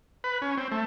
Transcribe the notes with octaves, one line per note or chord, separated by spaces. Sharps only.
B4
C#4
C4
A3